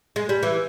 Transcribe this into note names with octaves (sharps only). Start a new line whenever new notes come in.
G#3
G3
E3